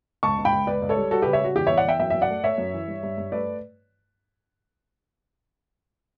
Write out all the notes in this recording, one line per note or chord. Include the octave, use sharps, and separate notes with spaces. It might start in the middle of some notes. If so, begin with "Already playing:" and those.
C#2 A5 C#6
C#2
G5 B5
C#2
C#2 B4 D5
C#2
A4 C#5
G3
G3 F#4 A4
C#3 G4 B4
C#5 E5
G3 F#4
E2 G4
E2 C#5 E5
D5 F#5
E2 E5 G5
F#2 E5 G5
F#2 E5
D5 F#5
A3
A3 C#5 E5
F#2
E3
G2
G2
G2
A3 B4 D5